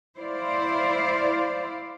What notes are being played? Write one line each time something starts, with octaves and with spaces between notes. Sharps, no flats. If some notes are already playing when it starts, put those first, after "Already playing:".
E4 C5 D5 F5